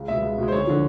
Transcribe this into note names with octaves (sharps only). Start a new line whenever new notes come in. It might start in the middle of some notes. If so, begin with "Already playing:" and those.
Already playing: C#2
B2 G#3 E5
C#2
B2 G#3
C5
D2 C#5
D3 F3